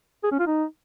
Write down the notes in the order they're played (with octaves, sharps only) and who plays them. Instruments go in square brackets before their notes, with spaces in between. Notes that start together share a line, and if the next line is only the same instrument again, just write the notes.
[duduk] G#4
C#4
F4
D#4